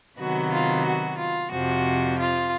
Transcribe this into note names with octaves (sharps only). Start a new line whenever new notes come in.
C3 D#3 F#3 B3 F#4
F4
F#4
F4
F2 C3 F3 F#4
F4